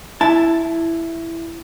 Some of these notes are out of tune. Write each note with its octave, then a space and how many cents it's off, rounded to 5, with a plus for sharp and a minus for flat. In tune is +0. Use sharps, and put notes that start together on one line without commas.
E4 +5 A5 +0